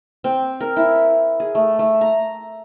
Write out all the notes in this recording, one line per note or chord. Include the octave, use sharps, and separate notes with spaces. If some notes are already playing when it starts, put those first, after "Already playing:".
C4
A#4
E4
G#4
A3
A3
A#5